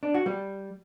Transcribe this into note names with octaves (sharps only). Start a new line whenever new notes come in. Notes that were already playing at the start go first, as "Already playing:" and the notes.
D4
F#4
G3